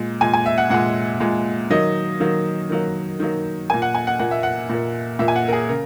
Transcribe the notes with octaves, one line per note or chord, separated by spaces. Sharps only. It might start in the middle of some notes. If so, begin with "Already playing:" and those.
Already playing: A#2 G#3
A#2 G#3 G#5
G#5
E5
F#5
A#2 G#3 F#5
A#2 G#3
D#3 F#3 A#3 D#5
D#3 F#3 A#3
D#3 F#3 A#3
D#3 F#3 A#3
A#2 A#3 G#5
F#5
G#5
F#5
A#2 A#3 F#5
E5
F#5
A#2 A#3
A#2 A#3 E5
G#5
F#5
A#4
G#4
C#3 A#4